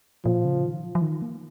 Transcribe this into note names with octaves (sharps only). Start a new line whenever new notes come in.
A#2 F3
C#3
D#3
F3
F3
D#3
A#3